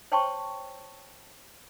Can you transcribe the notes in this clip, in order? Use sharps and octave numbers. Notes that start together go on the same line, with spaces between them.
C5 C#5 G5 A5 C6 C#6